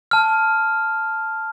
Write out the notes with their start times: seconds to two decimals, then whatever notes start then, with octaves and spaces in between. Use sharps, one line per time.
0.11 A5 F6